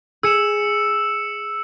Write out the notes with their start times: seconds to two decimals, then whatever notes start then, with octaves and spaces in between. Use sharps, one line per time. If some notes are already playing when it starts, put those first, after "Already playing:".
0.23 G#4 E6 C#7 E7